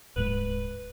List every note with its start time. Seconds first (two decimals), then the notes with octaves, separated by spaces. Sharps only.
0.16 D1 G#2 G#3 B4